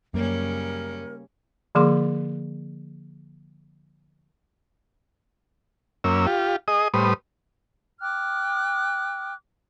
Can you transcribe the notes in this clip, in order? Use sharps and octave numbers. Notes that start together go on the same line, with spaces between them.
F#2 C#3 G3 A#3 C#4 A#4
D3 F3 A#3 G#4 C6 D6
F#2 A#3 C#4 E6
F4 G4
G#4 D#5 D#6
A2 G3 B4 C5 D#6
G5 D6 F6 F#6